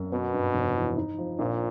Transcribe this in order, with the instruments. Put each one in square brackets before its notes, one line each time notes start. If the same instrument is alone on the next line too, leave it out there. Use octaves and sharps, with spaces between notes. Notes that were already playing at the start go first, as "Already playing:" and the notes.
Already playing: [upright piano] F#2
[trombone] B2 [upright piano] B3
[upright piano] G2
F1
E3
D#4
F3
[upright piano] A#1 [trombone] A#2